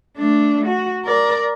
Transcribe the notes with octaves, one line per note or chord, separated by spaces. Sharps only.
A3 D4
F#4
A#4 D5